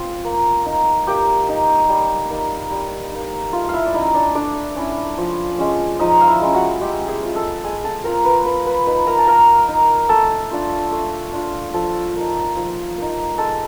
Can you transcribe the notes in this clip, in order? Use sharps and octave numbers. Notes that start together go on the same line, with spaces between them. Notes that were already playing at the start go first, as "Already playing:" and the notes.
Already playing: C4 F4
A#3
D#4
A#3 G4 G5
D#4
G3
A#3 D#4
G3
A#3 D#4
A3 F4 F5
F5
E4 E5
D5
C#4 D#4 E4 D#5
D4 D5
A3 D4 D5
C#4 E4
F3
G#3 C#4
F3 D#4 D#5
F5
E4 E5
G#3 C#4
F#4 F#5
G#3 G4 G5
G5
G#4 G#5
C4 F4
A4 A5
G#3 G#4 G#5
A4 A5
C4 F4 A#4 A#5
B4 B5
A#3 B4 B5
B4 B5
D#4 B4 B5
A#4 A#5
A5
A#3 A#4 A#5
D#4
A3 A4 A5
D4 F4
A3
D4 F4
F3 A4 A5
A#3 D#4
F3
A#3 D#4
G#3 A4 A5